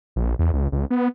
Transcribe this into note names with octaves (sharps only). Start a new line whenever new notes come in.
A#1
E2
C#2
C#2
B3